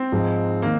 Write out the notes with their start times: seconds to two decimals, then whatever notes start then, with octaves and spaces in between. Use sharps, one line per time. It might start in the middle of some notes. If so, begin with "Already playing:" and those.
Already playing: C4
0.12 G#2 F3 G#3 D#4
0.62 D#3 A#3